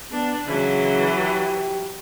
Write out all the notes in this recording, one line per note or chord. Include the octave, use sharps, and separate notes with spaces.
B3 D4
C#3 E3 F#3
G4